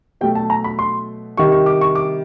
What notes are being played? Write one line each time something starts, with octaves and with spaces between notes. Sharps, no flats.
B2 F#3 A3 G5
A5
A#5
B5
C6
C3 D#3 G3 C#6
C#6
D6
C#6
D6